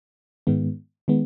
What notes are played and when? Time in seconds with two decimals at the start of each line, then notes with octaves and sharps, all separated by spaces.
0.47 G#2 D#3 G#3 B3
1.08 D#3 G#3 B3